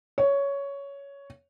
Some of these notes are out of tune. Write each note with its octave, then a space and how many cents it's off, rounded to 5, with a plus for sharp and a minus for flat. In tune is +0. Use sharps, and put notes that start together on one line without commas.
C#5 +10